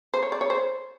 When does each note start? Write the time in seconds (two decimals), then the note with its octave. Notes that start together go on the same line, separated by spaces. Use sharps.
0.14 C5
0.23 C#5
0.32 D5
0.41 C#5
0.50 C5